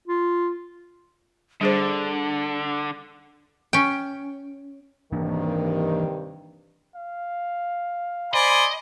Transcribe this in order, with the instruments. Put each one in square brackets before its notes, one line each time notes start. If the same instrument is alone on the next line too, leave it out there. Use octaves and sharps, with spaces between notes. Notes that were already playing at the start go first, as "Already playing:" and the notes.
[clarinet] F4
[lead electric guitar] D3 [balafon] G3 G#4 C5 [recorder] D4
[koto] C#4 G5
[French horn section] G2 C3 D#3 [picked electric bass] E3 A#3 D4
[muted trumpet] F5
[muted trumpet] C5 [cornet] D5 [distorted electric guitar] D#5 [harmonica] G#5 B5 C6